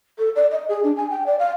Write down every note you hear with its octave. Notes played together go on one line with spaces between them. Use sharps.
A4
D5
D#5
G#4
D4
G#5
G5
D5
F5